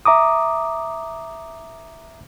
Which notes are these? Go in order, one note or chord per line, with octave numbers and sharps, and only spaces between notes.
E5 A#5 D6 D#6